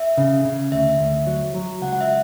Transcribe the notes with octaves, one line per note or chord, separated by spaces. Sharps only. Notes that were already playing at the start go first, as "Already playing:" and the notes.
Already playing: E5
C#3
C#3
D2 E5
D2
F#3
F#3
C#2 F#5
F#5
E5